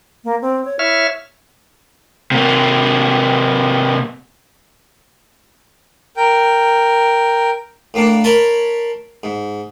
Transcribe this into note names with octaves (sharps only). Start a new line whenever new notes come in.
A#3
C4
C#5
E4 C#5 E5 F6
C3 A#3
A#4 G5
A2 A#3 D4
A#4 C#5 A5 B5 C6
G#2